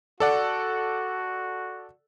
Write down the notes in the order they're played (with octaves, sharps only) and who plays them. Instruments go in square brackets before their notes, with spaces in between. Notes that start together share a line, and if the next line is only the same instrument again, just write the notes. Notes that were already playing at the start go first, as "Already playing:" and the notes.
[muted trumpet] F#4 [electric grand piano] A4 D5 F#5